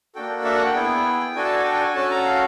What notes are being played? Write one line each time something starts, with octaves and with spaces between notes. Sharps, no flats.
A#3 D4 F#4 A4 G5
E5
F#5
G5
B3 E4 G#4
D4 F#4 A4 G#5
A5
G#5
G5
G#5
C#4 F#4 A4 A5
A#5
F5